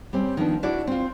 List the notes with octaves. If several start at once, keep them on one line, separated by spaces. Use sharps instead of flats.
G3 C4 C#4
D#3 F3 B3 D4
D4 E4 F#4 D5
C4 F4